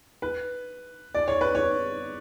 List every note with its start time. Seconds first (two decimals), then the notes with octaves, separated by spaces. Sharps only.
0.22 B4
1.14 D5
1.28 C#5
1.41 B4
1.55 C#5